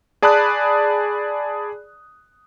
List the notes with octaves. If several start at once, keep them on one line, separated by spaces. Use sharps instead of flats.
G#4 D5 A5 B5 D#6 F#6